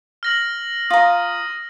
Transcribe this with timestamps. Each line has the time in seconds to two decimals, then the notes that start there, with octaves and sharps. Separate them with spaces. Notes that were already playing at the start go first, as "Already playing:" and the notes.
0.23 F6 A#6 F#7
0.90 F4 A#5 D#6